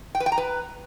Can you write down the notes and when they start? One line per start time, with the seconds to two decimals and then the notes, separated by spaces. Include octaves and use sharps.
0.15 G5
0.20 B4
0.26 G5
0.32 A#5
0.38 B4